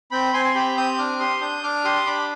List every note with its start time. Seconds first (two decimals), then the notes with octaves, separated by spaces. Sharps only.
0.11 C4 G5 B5
0.34 C4 G#5 C6
0.45 G#5
0.55 G4 G5 B5
0.77 C4 D#6 G6
0.98 D4 D6 F6
1.20 G4 C6 D#6
1.41 D4 D#6 G6
1.63 D4 D6 F6
1.85 G4 C6 D#6
2.06 D4 B5 D6